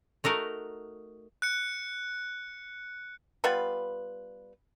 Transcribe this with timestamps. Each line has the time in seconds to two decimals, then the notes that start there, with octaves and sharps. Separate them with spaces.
0.24 A3 D#4 F#4 A#4
1.42 F#6 C#7
3.44 G3 B3 F4 B4